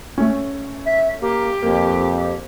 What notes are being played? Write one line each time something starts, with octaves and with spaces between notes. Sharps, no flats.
A3 C#4
E5
A#3 G4
F2 A#3